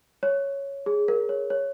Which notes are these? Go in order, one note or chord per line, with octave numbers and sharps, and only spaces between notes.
C#5
G#4
A#4
C#5
C#5